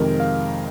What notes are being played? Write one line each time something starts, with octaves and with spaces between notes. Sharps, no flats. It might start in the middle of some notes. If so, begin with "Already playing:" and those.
Already playing: F2 C3 D#3 G#3 A#4
F5